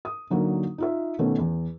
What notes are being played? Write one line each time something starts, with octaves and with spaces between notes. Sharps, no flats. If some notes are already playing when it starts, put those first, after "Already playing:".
D#6
D3 F#3 A#3 D#4
D#4 F4 E5
B2 D#3 A3 B3 C#4
E2